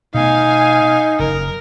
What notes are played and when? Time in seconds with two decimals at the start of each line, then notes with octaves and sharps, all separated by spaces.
0.14 B2 A3 D#4 F5 G#5
1.19 F#1 A#4